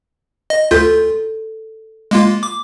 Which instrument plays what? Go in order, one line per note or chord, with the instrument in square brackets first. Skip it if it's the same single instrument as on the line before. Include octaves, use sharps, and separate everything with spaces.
[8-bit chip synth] D#5
[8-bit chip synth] D2 F4 [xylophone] A4 G6 B6
[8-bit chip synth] G#3 A#3 F4
D6